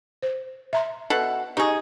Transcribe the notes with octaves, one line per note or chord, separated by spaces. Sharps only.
C5
E5 A#5 C6
B2 A4 F#5
D#4 G4 G#4 D#5 C#6